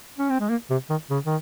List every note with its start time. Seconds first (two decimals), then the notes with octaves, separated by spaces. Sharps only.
0.18 C#4
0.30 C4
0.40 G#3
0.50 A#3
0.70 C3
0.90 D#3
1.10 C#3
1.26 D#3